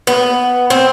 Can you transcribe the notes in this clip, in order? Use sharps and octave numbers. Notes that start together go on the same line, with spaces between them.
B3
C4